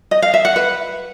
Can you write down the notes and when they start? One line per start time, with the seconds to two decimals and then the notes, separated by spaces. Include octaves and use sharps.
0.11 D#5
0.22 F5
0.34 E5
0.45 F#5
0.56 B4